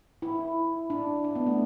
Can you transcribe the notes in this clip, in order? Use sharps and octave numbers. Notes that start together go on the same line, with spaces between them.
E4
D4
D4
B3
A3